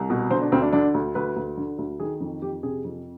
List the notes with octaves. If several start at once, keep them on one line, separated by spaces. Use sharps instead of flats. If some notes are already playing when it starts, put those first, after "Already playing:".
Already playing: C2
B2
D3 C5
D4
D2 C4
D4
D3 D4
D2
D2 B4
D2
D3
D2
D#3 G#4
F2
F2 G4
C3 G#4
F2